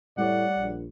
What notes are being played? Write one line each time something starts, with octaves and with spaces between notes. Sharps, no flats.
A2 G3 C#5 D5 F#5
A#1